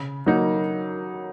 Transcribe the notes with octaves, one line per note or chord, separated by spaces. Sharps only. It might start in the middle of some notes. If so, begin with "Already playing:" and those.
Already playing: C#3
F#3 A#3 D#4